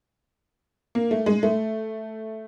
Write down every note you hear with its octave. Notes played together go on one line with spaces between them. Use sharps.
A#3
A3
G#3
A3